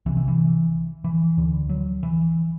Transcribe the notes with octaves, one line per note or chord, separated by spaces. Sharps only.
C2 C3 E3
E3
E3
E3
D2 D3
F#3
E3